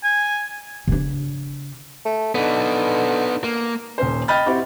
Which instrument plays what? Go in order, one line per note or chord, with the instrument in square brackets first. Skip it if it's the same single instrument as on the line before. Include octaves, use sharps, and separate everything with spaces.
[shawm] G#5
[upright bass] C#3 D4
[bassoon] A3
[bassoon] D3 [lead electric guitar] B3 D#4
[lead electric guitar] A#3
[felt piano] D#1 C#4 C5
D#5 G5 B5 F6 A6
C4 E4 F#4 G4